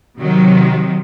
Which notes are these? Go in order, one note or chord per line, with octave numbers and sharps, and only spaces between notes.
C3 D#3 F#3